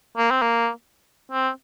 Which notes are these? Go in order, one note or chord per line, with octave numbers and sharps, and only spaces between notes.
A#3
C4
A#3
C4